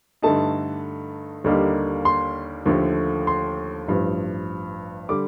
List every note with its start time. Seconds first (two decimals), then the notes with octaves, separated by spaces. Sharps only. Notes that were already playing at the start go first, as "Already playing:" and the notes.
0.22 G2 D3 A3 D#4 A5
1.44 D#2 D3 G3 A#3 D#4
2.05 C6
2.66 D#2 D3 F3 A3
3.27 C6
3.88 A1 G2 F3
5.09 D3 G3 D6